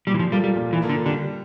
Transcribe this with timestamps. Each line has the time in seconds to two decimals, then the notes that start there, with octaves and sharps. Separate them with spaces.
0.07 A#2 G3
0.14 E3
0.19 F3
0.32 F3 G3 A#3 F4 A4
0.44 G3
0.56 A#2
0.73 E3
0.80 F3 A#3 F4 A4
0.89 D3
1.06 D3 G3